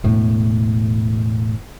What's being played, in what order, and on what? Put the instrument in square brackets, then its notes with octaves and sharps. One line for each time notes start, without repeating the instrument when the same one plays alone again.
[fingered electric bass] E1 A2